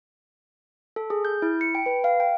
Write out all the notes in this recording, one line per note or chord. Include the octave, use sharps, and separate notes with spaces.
A4
G#4
G6
E4
C#7
G5
B4
F5
G5